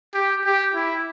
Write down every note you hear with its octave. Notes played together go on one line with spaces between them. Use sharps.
G4
G4
E4